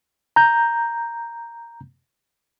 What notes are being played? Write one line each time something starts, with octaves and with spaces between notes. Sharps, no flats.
A#5 G6